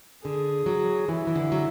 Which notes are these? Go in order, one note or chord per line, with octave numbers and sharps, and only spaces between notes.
D3 G#4
F#3
E3 E4
E3
D3
F#3